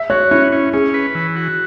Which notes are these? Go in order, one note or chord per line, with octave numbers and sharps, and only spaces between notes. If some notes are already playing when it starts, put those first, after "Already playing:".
Already playing: E5
F#4 C#5
C#4 E4
C#4
C#4 G#4
B4
E3
F#4